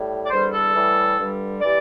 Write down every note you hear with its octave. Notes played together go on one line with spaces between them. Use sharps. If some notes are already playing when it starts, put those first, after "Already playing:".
Already playing: A2 G3
D5
E2 D3 G3 C5
A4
A2 E3 G3
G2 D3 G3
E3 G3 D5